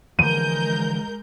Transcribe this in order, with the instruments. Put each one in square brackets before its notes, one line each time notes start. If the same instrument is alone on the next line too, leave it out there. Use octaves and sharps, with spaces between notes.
[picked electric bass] D3 E3 F3 [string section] G#3 A#4 G6 [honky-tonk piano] D#7